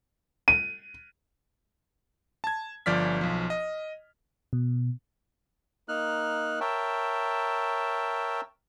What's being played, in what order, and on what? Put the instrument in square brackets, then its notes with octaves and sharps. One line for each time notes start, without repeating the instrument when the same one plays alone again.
[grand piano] D#7
[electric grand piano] A5 G#6
G1 F3 D5 F6 B6
B1 F3
D#5
[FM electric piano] B2
[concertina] A#3 D#4 F6 F#6
A#4 C#5 E5 G5 A5